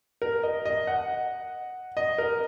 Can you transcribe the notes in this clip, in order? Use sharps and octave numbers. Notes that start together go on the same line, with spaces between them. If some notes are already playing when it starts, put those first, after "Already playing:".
A#4
D#5
D#5
F#5
D#5
A#4